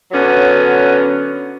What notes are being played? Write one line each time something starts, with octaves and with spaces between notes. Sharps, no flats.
D3 F#3 B3 C#4